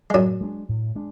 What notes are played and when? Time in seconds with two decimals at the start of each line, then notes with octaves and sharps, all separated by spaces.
0.10 G#3
0.14 F#2 A2 F#3
0.41 G#3 D4
0.69 A2
0.95 G#3 D4